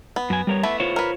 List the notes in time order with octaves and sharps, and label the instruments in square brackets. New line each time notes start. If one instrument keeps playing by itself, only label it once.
[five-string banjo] B3
[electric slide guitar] F#2 G#5
G3 A#4 C#5
[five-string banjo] E3 A3 B3 [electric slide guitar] E5
[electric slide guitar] F4 C5 C#5
[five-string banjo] A#4 B4